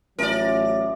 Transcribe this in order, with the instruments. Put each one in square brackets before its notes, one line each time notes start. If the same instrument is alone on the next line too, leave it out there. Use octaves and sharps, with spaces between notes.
[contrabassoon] A1 [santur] F3 C#4 E5 [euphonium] F#3 [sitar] A#4 D5